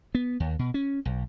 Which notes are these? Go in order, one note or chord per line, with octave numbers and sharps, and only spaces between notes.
B3
D#2
B2
C#4
B1